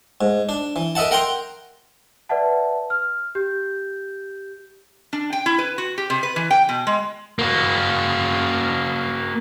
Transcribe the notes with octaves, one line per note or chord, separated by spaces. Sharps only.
G#2
D4
E3
A#4 D#5 E5 F#5 A5
A#4 F#5 G5 A#5 C6
B4 D5 E5 F#5 A5
F6
G4 G6
D4
G5
E4
B4
F#4
G4
C3
B4
E3
G5
B2
G#3
A#3 F#4